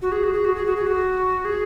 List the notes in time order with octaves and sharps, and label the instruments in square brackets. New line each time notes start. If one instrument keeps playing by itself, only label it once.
[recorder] F#4
G#4
F#4
G#4
F#4
G#4
F#4
G#4
F#4
G#4